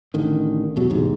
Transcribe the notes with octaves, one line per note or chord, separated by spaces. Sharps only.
A1 D3 D#3
E2 B2 F#3
A1 E2 G#2 C3